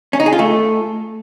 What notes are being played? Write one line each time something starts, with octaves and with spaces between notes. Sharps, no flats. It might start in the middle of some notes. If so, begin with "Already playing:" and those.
C#4
D#4
G#4
F4
A3